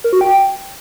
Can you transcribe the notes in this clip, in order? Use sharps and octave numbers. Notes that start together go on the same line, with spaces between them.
A#4
F#4
G5